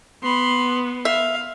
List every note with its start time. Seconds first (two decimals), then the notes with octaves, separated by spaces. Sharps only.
0.23 B3 B5 C6
1.05 E5 F5